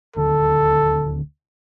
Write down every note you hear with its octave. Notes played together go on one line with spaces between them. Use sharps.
D#1 D2 D3 A4